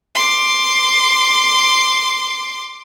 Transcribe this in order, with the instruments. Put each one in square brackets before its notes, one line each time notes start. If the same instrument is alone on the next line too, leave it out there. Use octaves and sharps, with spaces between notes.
[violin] C6 D6